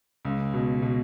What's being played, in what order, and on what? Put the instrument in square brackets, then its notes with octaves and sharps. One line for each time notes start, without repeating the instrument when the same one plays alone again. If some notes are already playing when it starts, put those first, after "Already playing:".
[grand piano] C#2
B2
B2